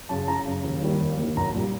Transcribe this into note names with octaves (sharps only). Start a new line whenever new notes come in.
F#2 C#3 A5
F#1 A#5
F#2 C#3
D#2
D#3 G3 A#3
D#2
D#3 G3 A#3
B1 A#5
A#2 G3 A#3